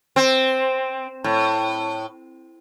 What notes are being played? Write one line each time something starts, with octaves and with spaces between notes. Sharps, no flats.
C4
A2